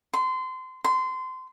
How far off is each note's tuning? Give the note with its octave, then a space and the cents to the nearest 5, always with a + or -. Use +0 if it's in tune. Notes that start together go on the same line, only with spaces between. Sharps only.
C6 -25
C6 -25